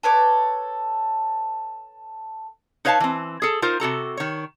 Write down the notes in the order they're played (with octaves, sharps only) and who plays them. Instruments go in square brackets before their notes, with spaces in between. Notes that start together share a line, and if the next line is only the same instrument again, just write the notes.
[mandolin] A4 B4 C#5 D6
[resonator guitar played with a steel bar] D#4 B4 C#5 F5 G#5 A5
E3 C4
G#4 A4
D#4 F4 A#4 C5
C3 F#4 A4 A#5
D#3 C#5